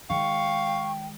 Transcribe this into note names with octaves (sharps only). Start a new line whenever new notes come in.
D#3 G#3 F5 G5 C#6